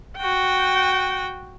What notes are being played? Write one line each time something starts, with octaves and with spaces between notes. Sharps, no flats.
F#4 G5